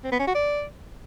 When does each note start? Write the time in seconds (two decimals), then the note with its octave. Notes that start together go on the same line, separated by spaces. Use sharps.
0.04 C4
0.12 B3
0.19 C#4
0.27 F#4
0.35 D5